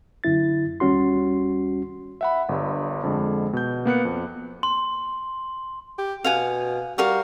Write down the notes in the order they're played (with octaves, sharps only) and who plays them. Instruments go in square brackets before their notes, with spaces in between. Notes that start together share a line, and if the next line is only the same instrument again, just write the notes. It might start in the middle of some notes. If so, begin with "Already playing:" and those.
[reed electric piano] F#2 D3 E4 A6
D#2 G3 C#4 F#4 C6
[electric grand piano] E5 F#5 B5
G1 G2
F2 D3 G#3
B2 G6
A#3 B3 F#6 C#7
F2
[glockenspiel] C6
[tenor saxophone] G4
[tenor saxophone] B2 [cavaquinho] F5 F#5 G#5
[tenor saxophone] G3 [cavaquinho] F#4 A#4 F5